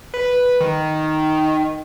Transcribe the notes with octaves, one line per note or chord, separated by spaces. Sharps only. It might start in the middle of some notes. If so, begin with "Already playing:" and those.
B4
D#3